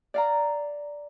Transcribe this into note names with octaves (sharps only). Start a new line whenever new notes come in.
D5 F5 A#5